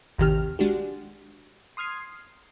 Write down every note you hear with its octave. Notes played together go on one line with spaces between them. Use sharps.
A1 D#2 C3 D#3 G4 F6
G#3 D4 F#4 G4
C6 D#6 F6 G#6 C7